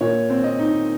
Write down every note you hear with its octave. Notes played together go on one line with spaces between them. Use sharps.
A#2 C#5
C4
D#5
D#4